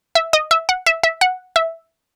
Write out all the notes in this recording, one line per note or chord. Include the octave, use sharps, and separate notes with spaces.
E5
D#5
E5
F#5
E5
E5
F#5
E5